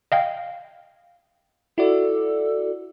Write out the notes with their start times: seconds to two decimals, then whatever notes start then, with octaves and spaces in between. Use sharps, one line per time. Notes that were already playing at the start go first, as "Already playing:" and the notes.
0.12 D#5 F5 G5
1.78 E4 F#4 A4 D5